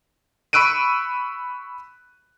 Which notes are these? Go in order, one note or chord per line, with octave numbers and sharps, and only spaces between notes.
B5 C#6 E6 F#6 D7 D#7